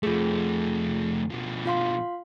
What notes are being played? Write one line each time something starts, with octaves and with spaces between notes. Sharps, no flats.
F2 A3 F4 G#4
B2 F3
F4 F5 C6